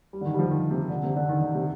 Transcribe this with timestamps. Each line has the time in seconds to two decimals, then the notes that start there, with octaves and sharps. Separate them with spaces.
0.13 G3
0.21 D3
0.25 D#3
0.34 G3
0.39 F3
0.51 D#3
0.71 C3
0.90 D3
1.03 C3
1.16 D3
1.29 D#3
1.41 D3
1.55 C3